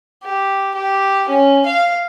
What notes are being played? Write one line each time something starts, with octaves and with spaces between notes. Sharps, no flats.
G4
G4
C#4
F5